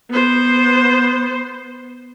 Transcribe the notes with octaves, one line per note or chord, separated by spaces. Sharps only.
B3 C5